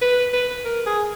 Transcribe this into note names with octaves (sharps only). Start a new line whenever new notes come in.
B4
B4
A#4
G#4